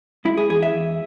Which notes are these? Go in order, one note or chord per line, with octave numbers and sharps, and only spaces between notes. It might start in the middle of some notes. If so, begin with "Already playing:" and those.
G#3 E4
G#4
E2 G#4
E5
E2